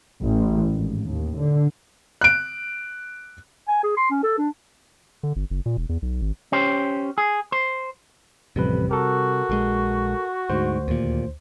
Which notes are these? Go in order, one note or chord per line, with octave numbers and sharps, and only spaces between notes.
A1
G#1
D#2
D3
F#6 D7
G#5
G#4
C6
C#4
A4
D4
D3
G1
F#1
A#2
E1
E2
B1
G#1
C#4 G4 C5
G#4
C5
A1 F2 C3 G3 B4
F#4 A4 A#4
A#1 F3 G#3
D2 G#2 C5
D#2 A#2